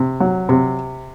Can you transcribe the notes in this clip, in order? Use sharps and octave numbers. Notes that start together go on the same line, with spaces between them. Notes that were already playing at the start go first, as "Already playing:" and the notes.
Already playing: C3
F#3
C3